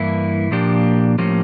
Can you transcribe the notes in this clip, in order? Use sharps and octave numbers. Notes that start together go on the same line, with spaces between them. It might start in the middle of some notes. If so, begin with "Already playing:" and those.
Already playing: G2 E3 A#3 E4
A#2 F3 A#3 D4 G4
A2 F3 A#3 C#4 G4